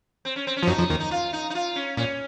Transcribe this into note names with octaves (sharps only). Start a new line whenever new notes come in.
C4
C#4
C4
C#4
F3
F#2 F#3 D#4
F2 F3
D#2 D#3
D#4
F4
D#4
D#4
F4
C#4
A#2 C#4